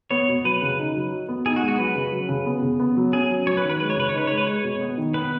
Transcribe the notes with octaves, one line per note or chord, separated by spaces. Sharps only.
B3 C#5
B2
F#3 B4
C#3
D#4
F#3
F#4
B3
D#4 G#4
F#4
G#3
F#4
F#3 B4
C#3
F#3
C#3
B3
C#3
B3
F#3
C#4 G#4
F#3
F#3 C#5
B4
D#3
B4
G#3 B4
C#5
C#3 B4
C#5
D#4 B4
G#3 C#5
B4
G#3 C#5
B2
B3
D#3
B3 B4